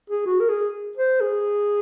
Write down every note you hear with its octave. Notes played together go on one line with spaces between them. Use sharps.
G#4
F#4
A#4
G#4
C5
G#4